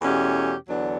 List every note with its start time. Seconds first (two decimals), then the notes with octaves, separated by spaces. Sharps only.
0.02 E2 B2 A3 C#4 G4
0.67 E2 D3 F#3 B3 D4